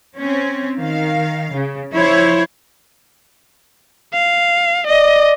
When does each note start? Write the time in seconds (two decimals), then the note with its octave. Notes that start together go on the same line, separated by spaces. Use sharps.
0.17 C4 C#4
0.78 D#3 F5
1.54 C#3
1.94 F3 E4 C5 C#5
4.13 F5
4.87 D5 D#5